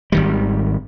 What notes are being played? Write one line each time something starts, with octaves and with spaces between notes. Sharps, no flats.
G#1 D#3 G3